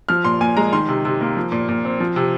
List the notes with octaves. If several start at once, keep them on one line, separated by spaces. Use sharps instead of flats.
F3 F6
A#2 C6
A#2 G#5
G#3 A#5
D#3 C6
C3
C3
A#3
F3
A#2
A#2
C4
F3
C3